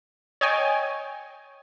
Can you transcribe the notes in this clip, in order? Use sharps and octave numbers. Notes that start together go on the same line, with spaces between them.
C#5 D#5 G5 G#5